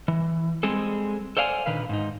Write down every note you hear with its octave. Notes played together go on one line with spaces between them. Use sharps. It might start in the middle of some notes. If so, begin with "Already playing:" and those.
E3
G3 G#3 C4 G#4 A4
A4 C5 D5 F5 F#5 G#5
A#2 D3 D#3 B4 F5
G#2 D#4